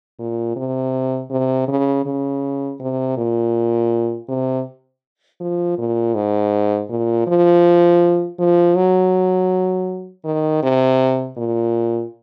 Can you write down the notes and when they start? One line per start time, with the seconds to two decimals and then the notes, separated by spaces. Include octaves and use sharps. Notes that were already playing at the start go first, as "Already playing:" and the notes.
0.19 A#2
0.56 C3
1.30 C3
1.68 C#3
2.06 C#3
2.80 C3
3.17 A#2
4.28 C3
5.40 F3
5.78 A#2
6.15 G#2
6.90 A#2
7.27 F3
8.39 F3
8.76 F#3
10.25 D#3
10.63 C3
11.37 A#2